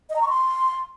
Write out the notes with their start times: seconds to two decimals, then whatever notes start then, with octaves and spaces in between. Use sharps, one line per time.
0.10 D#5
0.16 A#5
0.22 C#6
0.29 C6